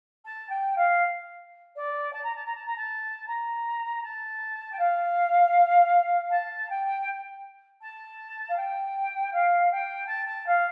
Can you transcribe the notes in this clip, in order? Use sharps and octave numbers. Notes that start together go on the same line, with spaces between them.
A5
G5
F5
D5
A5
A#5
A5
A#5
A5
A#5
A5
A#5
A5
G5
F5
A5
G5
A5
F5
G5
F5
G5
A5
A5
F5